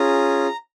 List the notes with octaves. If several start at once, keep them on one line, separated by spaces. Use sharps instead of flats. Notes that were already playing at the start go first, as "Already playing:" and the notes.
Already playing: C#4 F4 G#4 A#5